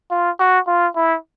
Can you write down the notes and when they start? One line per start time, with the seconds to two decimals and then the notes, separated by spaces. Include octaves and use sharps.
0.11 F4
0.40 F#4
0.67 F4
0.96 E4